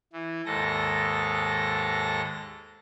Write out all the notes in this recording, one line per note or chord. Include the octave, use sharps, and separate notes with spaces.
E3
D#2 G#2 A4 A#6